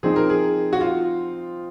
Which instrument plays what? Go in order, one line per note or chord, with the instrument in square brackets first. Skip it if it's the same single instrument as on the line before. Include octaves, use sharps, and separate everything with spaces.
[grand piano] F3 C4 D#4 [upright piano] G#4
[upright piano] A#4
G#4
F#4
F4